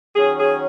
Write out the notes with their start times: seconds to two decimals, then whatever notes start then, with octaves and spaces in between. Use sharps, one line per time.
0.15 D#3 F#3 C#4 G#4
0.39 G#4